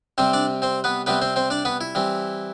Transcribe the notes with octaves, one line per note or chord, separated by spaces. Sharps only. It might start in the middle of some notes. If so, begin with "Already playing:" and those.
C3 G3 C4 C5
D4 D5
C4 C5
B3 B4
C3 G3 B3 C4 B4
C4 C5
C4 C5
D4 D5
B3 B4
E4
E3 G3 C4